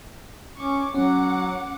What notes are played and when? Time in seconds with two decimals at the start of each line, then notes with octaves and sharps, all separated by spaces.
0.57 C#4 C#6 D6
0.95 F#3 C#4 F#5 D6